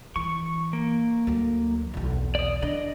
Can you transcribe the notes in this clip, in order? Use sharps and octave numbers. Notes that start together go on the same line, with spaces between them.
E3 C#6
A#3
D2 F#3
B1 E2
D5 D#6
D3 D5 D#5